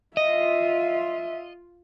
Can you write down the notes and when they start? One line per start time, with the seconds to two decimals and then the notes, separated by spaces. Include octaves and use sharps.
0.17 F4 D#5 E5